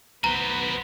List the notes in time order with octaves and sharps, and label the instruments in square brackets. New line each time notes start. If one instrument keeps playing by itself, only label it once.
[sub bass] B1 [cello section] B3 B4 [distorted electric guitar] F#4 C5 [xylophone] A#5